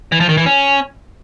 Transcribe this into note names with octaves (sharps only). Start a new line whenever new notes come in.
E3
F3
D#3
E3
C#4